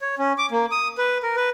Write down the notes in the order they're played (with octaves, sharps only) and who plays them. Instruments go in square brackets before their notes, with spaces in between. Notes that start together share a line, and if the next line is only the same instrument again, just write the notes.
[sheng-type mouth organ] C#5
C#4
D6
A#3
D#6
B4
A#4
B4